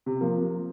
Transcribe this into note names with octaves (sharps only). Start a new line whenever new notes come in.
C3
F3 A#3